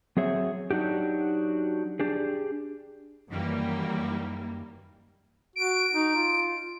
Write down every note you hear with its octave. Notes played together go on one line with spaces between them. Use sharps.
F#3 C4 G#4 C#5 E5
F#3 D4 D#4 F#4 G4
D4 G4 G#4
F#2 D#3 E3 G3 A#3
F#4 D7
D#4
F4